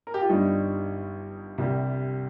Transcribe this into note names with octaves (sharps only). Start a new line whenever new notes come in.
A#4
G4
F4
G1 G2 G3 D#4
C2 C3 G3